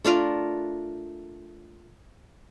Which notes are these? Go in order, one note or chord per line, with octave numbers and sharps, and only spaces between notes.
A3 D4 F4 A#4